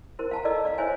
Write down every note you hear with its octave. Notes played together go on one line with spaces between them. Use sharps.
E4 A#4 C5
F5 A5 A#5
E4 A4 D5 D#5 E6
D5 F5
E4 C5 C#5 E5 G#5